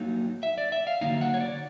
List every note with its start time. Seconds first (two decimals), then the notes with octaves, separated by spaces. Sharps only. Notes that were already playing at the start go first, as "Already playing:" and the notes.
Already playing: F#3 A#3 D#4
0.43 E5
0.58 D5
0.72 E5
0.87 F5
1.01 D3 F#3 A#3 D#4 F5
1.21 F#5
1.34 C#5
1.40 D5